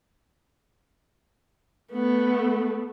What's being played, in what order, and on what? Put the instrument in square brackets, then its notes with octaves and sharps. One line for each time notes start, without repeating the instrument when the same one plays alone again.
[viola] A3 B3